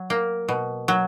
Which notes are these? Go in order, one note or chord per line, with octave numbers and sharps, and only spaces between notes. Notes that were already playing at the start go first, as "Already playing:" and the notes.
Already playing: F#3
A#3
B2
F#3